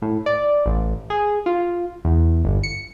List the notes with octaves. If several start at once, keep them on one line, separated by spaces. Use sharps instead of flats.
A2
D5
A1
G#4
F4
E2
G1
C#7